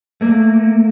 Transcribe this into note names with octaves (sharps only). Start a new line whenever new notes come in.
A3 A#3